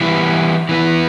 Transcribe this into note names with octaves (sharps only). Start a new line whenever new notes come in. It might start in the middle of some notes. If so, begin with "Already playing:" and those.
E3 G3 B3 E4
E3 B3 E4